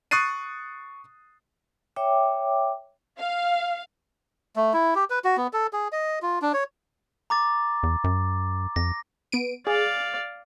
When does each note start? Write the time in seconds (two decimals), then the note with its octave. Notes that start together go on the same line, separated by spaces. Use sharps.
0.11 C#6 D#6 F#6 A6 C7 D#7
1.96 C#5 E5 G5 D6
3.21 F5
4.56 A3
4.74 E4
4.95 G4
5.10 B4
5.24 F#4
5.37 B3
5.53 A4
5.73 G#4
5.92 D#5
6.22 F4
6.42 D4
6.54 C#5
7.30 A#5 D6 A6
7.83 E2
8.04 F#2
8.76 F2 A#6
9.32 B3 D7 D#7
9.67 G#4 D5 F5